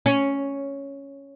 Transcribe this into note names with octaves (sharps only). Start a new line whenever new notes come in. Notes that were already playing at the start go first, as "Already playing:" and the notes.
C#4